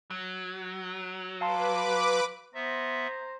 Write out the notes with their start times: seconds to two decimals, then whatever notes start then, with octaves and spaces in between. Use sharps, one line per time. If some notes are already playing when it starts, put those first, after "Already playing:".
0.11 F#3
1.41 B4 F5 A5 C6 D6
2.54 B3 C5 E5 A#5